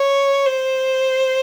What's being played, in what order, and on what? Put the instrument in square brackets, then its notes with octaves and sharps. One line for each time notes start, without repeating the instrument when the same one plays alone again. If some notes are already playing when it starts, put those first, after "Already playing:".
Already playing: [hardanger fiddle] C#5
C5